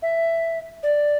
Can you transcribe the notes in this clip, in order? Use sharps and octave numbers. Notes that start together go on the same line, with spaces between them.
E5
D5